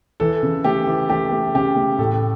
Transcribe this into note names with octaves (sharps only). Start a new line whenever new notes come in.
E3 A4
C#3
A3 G4
E3
A3 G4
A3
C#3 G4
A3
A2 A4